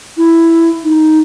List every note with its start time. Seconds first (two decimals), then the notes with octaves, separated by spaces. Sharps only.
0.17 E4
0.84 D#4